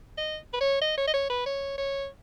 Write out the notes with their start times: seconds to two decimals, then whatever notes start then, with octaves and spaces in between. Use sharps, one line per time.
0.17 D#5
0.53 B4
0.60 C#5
0.81 D#5
0.97 C#5
1.07 D#5
1.13 C#5
1.30 B4
1.46 C#5
1.78 C#5